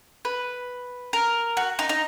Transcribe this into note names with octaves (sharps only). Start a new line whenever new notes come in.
B4
A#4
F#4
D#4
D#4